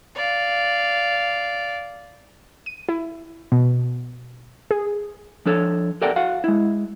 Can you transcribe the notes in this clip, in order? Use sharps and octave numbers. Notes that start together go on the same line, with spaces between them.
D5 F5
D#7
E4
B2
G#4
F3 D4 A4 C#5
G4 A4 A#4 D5 F#5 G5
F#4 F5 F#5
G#3 E4